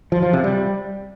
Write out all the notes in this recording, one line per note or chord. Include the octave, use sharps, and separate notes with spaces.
F3
F3
C3
G3